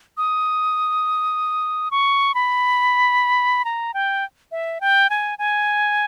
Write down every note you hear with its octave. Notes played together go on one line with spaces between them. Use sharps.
D#6
C#6
B5
A#5
G5
E5
G5
G#5
G#5